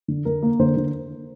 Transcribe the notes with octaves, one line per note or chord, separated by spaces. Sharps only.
D3
D3 A#4
A#3
D3 C5
D3